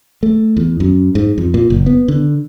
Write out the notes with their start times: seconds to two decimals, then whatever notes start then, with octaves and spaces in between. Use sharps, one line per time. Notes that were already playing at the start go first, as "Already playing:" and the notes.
0.23 A3
0.57 E2
0.80 F#2
1.15 G#2
1.38 F2
1.54 A#2
1.70 F#1
1.86 B3
2.08 D3